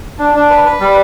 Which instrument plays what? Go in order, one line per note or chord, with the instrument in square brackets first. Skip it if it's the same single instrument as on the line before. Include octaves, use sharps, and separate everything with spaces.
[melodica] D4
D4
B4
B4
G3